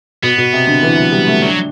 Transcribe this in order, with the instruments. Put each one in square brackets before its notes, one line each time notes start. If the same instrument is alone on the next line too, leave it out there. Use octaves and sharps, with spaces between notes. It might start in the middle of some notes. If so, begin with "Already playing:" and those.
[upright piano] B2 [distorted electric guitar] B3
[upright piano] B2
C3
D3
E3
F#3
G3
A3
[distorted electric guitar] F#3 [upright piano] D4